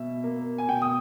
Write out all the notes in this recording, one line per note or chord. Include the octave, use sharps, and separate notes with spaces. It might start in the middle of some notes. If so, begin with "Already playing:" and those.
Already playing: B2 E5
A#3
G#5
B2 G5
D#6